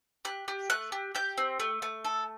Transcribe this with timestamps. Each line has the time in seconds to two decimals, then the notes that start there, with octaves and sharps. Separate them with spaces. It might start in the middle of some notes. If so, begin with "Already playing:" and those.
0.25 G4 F#6
0.48 G4
0.70 A3 F#6
0.92 G4
1.15 G4 G6
1.38 C4
1.60 A3
1.82 A3
2.05 A4